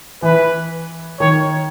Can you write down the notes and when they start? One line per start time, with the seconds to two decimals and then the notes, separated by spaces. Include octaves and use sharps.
0.22 E3 B4
1.20 D#3 C#5